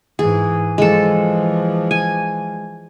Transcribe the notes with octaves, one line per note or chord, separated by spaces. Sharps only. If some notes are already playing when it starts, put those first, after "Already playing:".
G#2 E3 G#4
E3 F3 G#3 A4
G#5